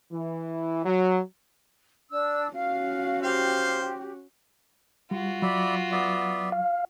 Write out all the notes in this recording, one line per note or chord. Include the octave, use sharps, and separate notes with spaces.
E3
F#3
D4 E6
C#4 F#4 F5
G4 C5 F5
G3 F4 F#4
F#3 D5 E5 B5
B3 D5 E5
F5